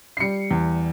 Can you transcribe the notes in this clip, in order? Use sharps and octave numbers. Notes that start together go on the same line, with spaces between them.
C7
G3 C#7
E2